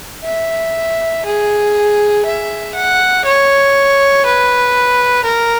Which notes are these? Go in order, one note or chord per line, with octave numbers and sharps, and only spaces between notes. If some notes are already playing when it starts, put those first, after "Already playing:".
E5
G#4
E5
F#5
C#5
B4
A#4